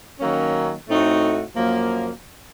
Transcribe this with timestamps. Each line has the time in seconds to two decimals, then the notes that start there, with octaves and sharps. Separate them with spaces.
0.20 D#3 F#3 A#3 C#4
0.89 A2 A3 C4 D#4 F#4
1.57 F#2 F3 A#3